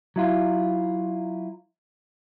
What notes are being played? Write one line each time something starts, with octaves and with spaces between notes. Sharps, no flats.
F#3 E4 F4